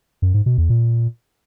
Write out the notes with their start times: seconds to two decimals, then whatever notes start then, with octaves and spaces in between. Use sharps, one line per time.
0.22 F#2
0.34 G#2
0.46 B2
0.58 E2
0.70 A#2